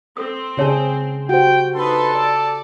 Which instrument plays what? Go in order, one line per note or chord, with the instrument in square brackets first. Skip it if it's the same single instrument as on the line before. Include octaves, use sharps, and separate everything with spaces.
[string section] C4 [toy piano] A4 D#6
[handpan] C#3 C#4 G#4 [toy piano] E4 C#5 A5
[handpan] F#4 G4 C5 [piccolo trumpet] G5
[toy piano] D4 [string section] D#4 B4 C6 [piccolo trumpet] A4
[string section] D5